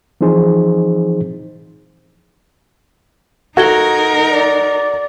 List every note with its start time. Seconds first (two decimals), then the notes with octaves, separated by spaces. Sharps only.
0.21 E3 F3 C4 D#4 G#4 C5
3.57 D#4 F#4 A4 A#4 G#6 G7
4.30 D5